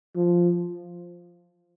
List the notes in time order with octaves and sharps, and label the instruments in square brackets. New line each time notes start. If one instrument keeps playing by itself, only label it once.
[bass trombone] F3